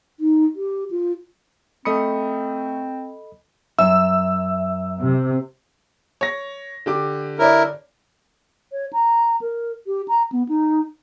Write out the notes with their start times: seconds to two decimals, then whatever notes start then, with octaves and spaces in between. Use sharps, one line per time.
0.20 D#4
0.56 G4
0.91 F4
1.85 A3 C4 A4 D#5 B5 D#6 C#7
3.79 F#2 E5 E6
5.01 C3
6.21 C#5 A#6
6.86 D3 G4 D6
7.39 E4 A#4 C#5 D5
8.72 C#5
8.93 A#5
9.41 A#4
9.87 G4
10.08 A#5
10.32 B3
10.49 D#4